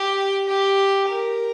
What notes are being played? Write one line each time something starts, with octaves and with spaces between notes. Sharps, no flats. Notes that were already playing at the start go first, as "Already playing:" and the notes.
Already playing: G4
G4
A#4